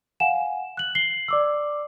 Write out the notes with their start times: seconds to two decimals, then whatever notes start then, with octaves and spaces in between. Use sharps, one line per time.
0.20 F5 F#5 G#5 E7
0.77 F#6 F#7
0.95 C7 F#7 G7
1.28 D5 D6 E6